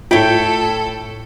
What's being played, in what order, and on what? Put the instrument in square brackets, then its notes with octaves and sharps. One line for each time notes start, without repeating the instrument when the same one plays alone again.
[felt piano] A2 B6 [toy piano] F4 E5 [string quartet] A4 [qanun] C#5 G5